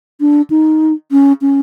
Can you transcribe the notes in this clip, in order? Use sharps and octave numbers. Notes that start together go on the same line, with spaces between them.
D4
D#4
C#4
C#4